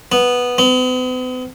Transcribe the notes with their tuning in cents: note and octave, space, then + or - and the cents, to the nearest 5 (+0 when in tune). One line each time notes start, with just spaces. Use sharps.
B3 -5
B3 +45